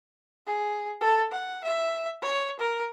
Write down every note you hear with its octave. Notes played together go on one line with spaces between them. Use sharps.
G#4
A4 A5
F#5
E5
C#5
A#4